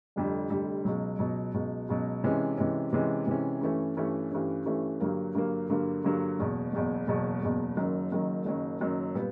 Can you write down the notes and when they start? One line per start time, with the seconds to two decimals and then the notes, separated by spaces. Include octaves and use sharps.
0.16 F1 F2 D3 G3
0.50 F1 F2 D3 G3
0.85 C#2 B2 F#3
1.19 C#2 B2 F#3
1.54 C#2 B2 F#3
1.89 C#2 B2 F#3
2.24 C3 E3 G#3 C#4
2.57 C3 E3 G#3 C#4
2.93 C3 E3 G#3 C#4
3.27 C3 E3 G#3 C#4
3.61 G2 E3 A3 C#4
3.97 G2 E3 A3 C#4
4.31 G2 E3 A3 C#4
4.66 G2 E3 A3 C#4
5.01 G2 D3 F#3 A#3
5.35 G2 D3 F#3 A#3
5.70 G2 D3 F#3 A#3
6.04 G2 D3 F#3 A#3
6.39 F#1 E2 B2
6.73 F#1 E2 B2
7.07 F#1 E2 B2
7.42 F#1 E2 B2
7.77 F#1 F#2 D#3 F#3
8.12 F#1 F#2 D#3 F#3
8.45 F#1 F#2 D#3 F#3
8.80 F#1 F#2 D#3 F#3
9.15 A#2 G3 B3